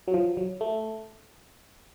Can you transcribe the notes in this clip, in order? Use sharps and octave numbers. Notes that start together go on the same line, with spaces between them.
F#3
F3
F#3
A3